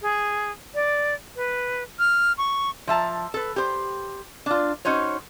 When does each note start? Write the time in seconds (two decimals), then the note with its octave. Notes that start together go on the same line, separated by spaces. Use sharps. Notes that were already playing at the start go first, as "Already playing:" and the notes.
0.02 G#4
0.75 D5
1.36 B4
1.99 F6
2.38 C#6
2.87 F3 E5 A5 A#5
3.34 A4 B4
3.56 G4 C5
4.46 D4 F4
4.85 C#4 D#4 F#4 C5 C#5